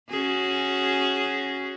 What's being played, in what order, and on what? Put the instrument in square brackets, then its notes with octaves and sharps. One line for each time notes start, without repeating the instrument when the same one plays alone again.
[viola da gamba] C#4 F#4 G#4